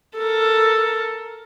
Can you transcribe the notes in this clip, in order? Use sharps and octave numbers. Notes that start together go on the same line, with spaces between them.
A4 A#4